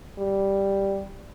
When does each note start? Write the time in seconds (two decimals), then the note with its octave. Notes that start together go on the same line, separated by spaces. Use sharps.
0.19 G3